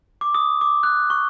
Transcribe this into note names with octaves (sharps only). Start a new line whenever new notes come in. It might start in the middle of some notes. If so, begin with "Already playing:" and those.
D6
D#6
D6
F#6
C#6